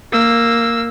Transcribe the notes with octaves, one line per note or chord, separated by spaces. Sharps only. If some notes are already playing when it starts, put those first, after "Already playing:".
A#3 E6